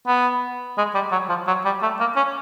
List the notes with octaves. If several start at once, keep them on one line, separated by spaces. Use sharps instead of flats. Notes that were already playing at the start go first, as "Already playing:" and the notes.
B3
G#3
G3
F#3
F3
F#3
G3
A3
A#3
C#4